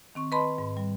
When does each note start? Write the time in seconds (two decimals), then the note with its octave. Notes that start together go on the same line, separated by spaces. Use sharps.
0.15 D#3 C4 C#6
0.32 B4 D#5 A5 B5 C6
0.58 G#2
0.77 G3